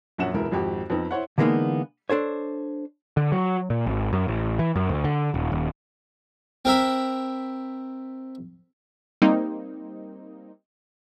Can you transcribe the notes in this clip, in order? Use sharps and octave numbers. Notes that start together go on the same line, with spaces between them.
A#1 F#2 C#4 F#5 E7
E1 C#2 E4 A#4
G#1 F2 F#4 G4
F2 B3 C4 D#4
E4 C5 C#5 F#5
D3 E3 G#3 A#3 B3 D#4
D4 A4 C5 C#5
D3
F#3
A#2
G#1
F#2
A1
E3
F#2
D2
D3
D#1
D#1
C4 A#4 E5 B5
G3 A#3 C4 D#4